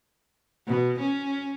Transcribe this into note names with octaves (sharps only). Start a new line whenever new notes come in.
B2
C#4